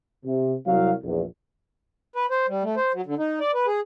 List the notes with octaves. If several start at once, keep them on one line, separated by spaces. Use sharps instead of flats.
C3
C2 F#3 F5
A#1 E2
B4
C5
G3
A3
C5
F#3
D3
D#4
D5
B4
G#4